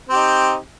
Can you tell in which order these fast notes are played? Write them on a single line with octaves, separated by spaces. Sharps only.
C4 G4 D#4